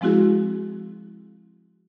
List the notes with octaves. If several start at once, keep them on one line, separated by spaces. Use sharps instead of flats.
F3 G#3 C4 E4 F#4 G#4